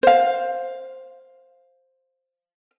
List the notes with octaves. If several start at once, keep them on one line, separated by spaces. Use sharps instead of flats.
C5 F5